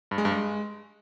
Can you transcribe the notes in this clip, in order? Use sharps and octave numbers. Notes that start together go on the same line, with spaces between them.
G2
G#3
G2
G#3